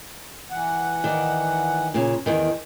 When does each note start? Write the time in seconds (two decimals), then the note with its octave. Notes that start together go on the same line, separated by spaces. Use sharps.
0.51 E3 F#5
1.04 D#3 D5
1.94 A#2 C#3
2.26 E2 D#3